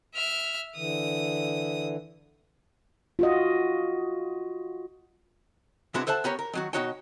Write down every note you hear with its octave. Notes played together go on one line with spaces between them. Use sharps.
E5 F6
D3 E3 D#6
F4 F#4 D#5
C3 G#3 B3 D4 E4 F#4
A4 C5 E5 F#5 A5
B3 G4 A#4 C#5
A#4
D#3 F#3 F#4
B2 D3 D#4 F#4 C#5 G5